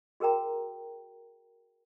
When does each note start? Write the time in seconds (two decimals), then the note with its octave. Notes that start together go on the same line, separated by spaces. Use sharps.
0.20 F#4 G#4 A#4 G5 A#5